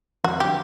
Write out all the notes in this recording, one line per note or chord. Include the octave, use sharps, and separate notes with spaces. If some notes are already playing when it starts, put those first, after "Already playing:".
F2 F#4
D3 F#3 G4